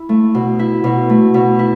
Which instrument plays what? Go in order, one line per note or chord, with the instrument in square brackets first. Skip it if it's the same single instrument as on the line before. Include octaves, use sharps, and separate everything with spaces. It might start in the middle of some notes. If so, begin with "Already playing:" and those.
Already playing: [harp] E4
A3
B2
E4
B2
A3
B2
E4